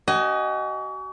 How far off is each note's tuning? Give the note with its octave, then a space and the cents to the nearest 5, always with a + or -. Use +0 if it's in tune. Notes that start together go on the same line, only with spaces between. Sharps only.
F#4 +40 D#5 +0 G#5 +0